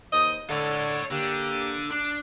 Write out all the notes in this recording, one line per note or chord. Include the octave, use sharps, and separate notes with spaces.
D#2 C5 D#5
D3 A4 C#5
D3 A#3 G4
D4